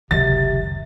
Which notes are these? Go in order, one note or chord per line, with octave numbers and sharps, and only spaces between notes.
F#1 C#2 C3 D#3 F#3 A6